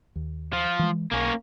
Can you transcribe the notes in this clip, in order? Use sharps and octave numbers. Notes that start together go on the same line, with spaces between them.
D#2
F3
E3 G#3
B1 A#3 C#4